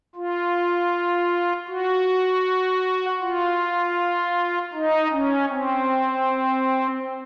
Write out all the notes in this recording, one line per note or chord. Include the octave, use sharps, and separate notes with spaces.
F4
F#4
F4
D#4
C#4
C4